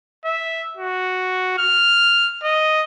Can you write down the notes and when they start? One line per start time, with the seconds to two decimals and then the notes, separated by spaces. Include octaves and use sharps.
0.25 E5
0.77 F#4
1.58 F6
2.44 D#5